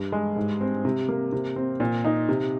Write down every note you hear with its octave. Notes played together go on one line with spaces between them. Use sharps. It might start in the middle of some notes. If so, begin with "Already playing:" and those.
Already playing: G2
G#3
G#2
C4
C3
A#3
C3
C4
A#2
D#4
C3